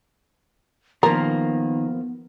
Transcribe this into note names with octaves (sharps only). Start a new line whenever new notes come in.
D#3 F3 A#3 B3 A#4